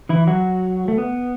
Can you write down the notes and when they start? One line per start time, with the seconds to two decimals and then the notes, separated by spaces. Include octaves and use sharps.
0.09 E3 E4
0.27 F#3 F#4
0.88 A3
0.98 B3